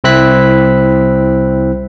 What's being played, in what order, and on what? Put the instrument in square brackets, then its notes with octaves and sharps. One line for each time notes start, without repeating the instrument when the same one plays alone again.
[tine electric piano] C2 C4 E4 F#6 B6